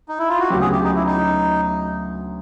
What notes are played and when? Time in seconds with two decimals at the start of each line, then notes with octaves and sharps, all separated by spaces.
0.08 D#4
0.18 E4
0.29 F4
0.39 F#4
0.50 D2 C#3 F#3 B3 G4
0.61 G#4
0.72 G4
0.83 D#4
0.95 E4
1.06 D#4